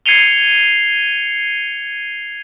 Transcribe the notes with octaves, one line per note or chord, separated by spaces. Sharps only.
G#6 C7 C#7 D#7 F7 G7